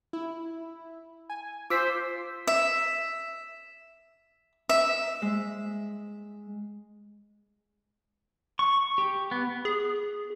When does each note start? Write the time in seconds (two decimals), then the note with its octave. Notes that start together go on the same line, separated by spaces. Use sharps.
0.13 E4
1.30 G#5
1.70 F4 C5 D6 E6 B6
2.47 E5
4.69 E5
5.22 G#3
8.59 C#6
8.98 G4
9.31 B3
9.65 G#4